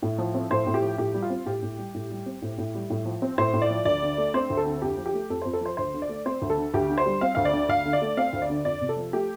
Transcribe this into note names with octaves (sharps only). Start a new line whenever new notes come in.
A2
F3
C4
A2 C5
A2
G4
F3
A2 G4
G3
F4
C4
A2 G4
A2
G3
A2
G3
C4
A2
A2
G3
A2
F3
C4
A2 C5
A2
D5
F3
D2 D5
D3
A3
C4 C5
D2
A4
D3
F2 G4
F3
G4
A3
F2 A4
F2 C5
A4
F3 C5
D2 C5
D3
D5
A3
C4 C5
D2
A4
D3
D2 G4
D3
C5
G3
C4 F5
D2 F5
D5
D3
D2 F5
D3
D5
A3
C4 F5
D2
D5
D3
F2 D5
C3
A4
F3
A3 G4